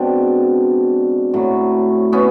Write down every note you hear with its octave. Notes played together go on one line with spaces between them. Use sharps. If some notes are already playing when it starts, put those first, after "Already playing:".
Already playing: B2 G#3 C4 D4
A2 F#3
B3 C#4